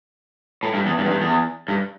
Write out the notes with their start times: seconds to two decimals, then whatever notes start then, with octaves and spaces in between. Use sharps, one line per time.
0.63 A2
0.74 G2
0.86 E2
0.98 G2
1.04 E2
1.10 G2
1.21 E2
1.68 G2